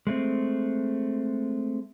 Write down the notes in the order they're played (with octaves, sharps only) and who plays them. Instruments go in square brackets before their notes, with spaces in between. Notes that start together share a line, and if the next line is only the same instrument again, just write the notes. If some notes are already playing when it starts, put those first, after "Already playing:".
[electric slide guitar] G#3 A3 C4